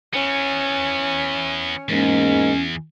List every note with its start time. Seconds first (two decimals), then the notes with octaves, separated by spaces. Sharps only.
0.14 E3 B3 C#4
1.89 E2 G#2 G#3 A#3 C#4